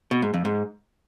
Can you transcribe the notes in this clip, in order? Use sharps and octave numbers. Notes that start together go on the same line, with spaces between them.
B2
G#2
F2
G#2